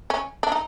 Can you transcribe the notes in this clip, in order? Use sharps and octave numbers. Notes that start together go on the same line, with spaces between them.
C#4
D4
D#4